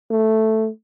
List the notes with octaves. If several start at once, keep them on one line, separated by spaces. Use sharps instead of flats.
A3